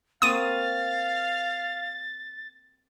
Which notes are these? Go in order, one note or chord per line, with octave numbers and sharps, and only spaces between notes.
A#3 C4 F#4 F5 D#6 A6 D#7